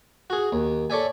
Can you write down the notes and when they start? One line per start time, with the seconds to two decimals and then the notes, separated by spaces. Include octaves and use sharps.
0.30 F#4 G#4
0.52 D#2
0.90 A4 C#5 D5 E5 G#5